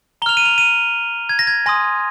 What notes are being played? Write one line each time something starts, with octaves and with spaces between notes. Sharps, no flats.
A#5 F6 F7 G7
D#7
F7
D#7
G#6
A#6
G#6
G#5 C6 D#6 A#6